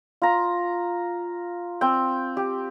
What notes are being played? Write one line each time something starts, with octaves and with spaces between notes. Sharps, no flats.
F4 A#5
C4 G5
G4